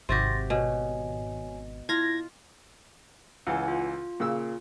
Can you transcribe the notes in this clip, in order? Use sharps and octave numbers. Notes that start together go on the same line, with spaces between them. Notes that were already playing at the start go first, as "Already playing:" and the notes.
G#1 C3 F#4 G4 C6 A6 A#6
B2 C#5 G#5
E4 F4 G#6 A#6
C#2 E3 F#5 G#5
F4
A#2 C#3 E6